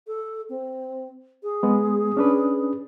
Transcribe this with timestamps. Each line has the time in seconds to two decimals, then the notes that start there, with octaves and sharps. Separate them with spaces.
0.07 A4
0.49 C4
1.43 G#4
1.63 G#3 B3
2.17 C#4 D4 B4